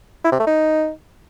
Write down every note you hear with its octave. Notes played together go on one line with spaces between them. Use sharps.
E4
C3
A3
D#4